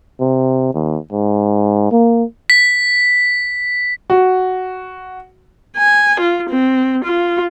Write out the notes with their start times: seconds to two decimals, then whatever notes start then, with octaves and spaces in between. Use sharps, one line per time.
0.20 C3
0.75 D#2
1.12 G#2
1.92 A#3
2.50 B6
4.10 F#4
5.78 G#5
6.20 F4
6.50 C4
7.04 F4